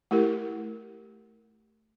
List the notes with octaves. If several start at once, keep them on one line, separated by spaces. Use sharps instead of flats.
A3 E4 G4 A#4